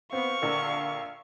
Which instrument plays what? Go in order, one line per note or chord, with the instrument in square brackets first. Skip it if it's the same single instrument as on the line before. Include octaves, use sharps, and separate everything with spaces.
[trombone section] B3 [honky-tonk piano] C4 [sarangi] F5 [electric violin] C#6
[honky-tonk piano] A#1 A#4 [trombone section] D3